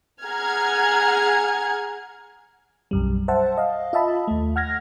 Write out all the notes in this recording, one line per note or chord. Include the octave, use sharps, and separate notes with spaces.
G#4 F#5 A#5 F6 G#6
B1 F#2 G3
C5 E5 F#5 A5
D#5 F5
F4 D#5 E5 A5 B5
D#2 A3
F#5 F6 G#6 A#6